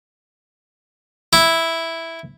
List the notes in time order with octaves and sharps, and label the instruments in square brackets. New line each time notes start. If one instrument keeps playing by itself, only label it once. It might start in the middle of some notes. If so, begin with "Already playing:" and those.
[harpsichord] E4